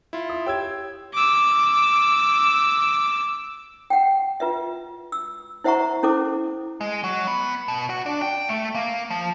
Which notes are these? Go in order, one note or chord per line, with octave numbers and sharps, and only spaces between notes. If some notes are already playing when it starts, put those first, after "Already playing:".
E4 F4
D#6
G4 C#5 G5 E6 G#6
D6 E6
F#5 G5
F4 B4 E5
E6
E4 C5 E5 F#5 A#5 C#6
C#4 E4 A4 C5 D6
G#3
F#3
B3
B2
F#4
D4
G5
A3
A#3
F3